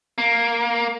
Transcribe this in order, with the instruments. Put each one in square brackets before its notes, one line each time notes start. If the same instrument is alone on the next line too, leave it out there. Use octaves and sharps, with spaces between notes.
[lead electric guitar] A#3